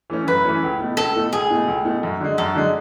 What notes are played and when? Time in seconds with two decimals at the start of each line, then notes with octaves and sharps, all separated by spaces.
0.10 E3 A3 C#4
0.27 F#2 B4
0.44 E3 A3 C#4
0.63 C#2
0.79 B2 A3
0.97 C#2 A4
1.15 B2 A3
1.32 C#2 G#4
1.50 B2 A3
1.68 C#2
1.85 B2 A3
2.03 F#2
2.20 D3 G#3
2.38 F#2 A4
2.55 D3 G#3